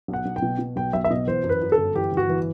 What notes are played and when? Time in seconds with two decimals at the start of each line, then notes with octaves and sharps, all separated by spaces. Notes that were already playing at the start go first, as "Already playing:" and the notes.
0.08 B1
0.13 F#5
0.26 B1
0.36 G5
0.42 B2
0.59 B2
0.76 B1 G5
0.93 B1 E5
1.04 E5
1.10 B2 D#5
1.27 E3 C5
1.44 F#2
1.49 B4
1.62 F#2
1.72 A4
1.78 G1
1.95 E3 G4
2.12 G1
2.17 F#4
2.29 E3